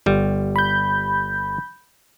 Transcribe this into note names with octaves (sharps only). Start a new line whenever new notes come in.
G1 G3
B5 G6